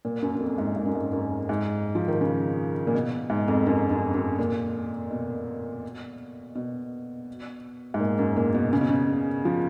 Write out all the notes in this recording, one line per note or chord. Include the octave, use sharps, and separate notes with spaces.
A#2
F#2
F#2
F2
G#2
G#2
F#2
G#2
F#2
G#2
F3
D#3
C#3
A#2
B2
G#2
F2
F#2
F#2
F#2
A#2
B2
B2
G#2
A#2
F#2
A#2
B2
C#3
B2
C#3
F3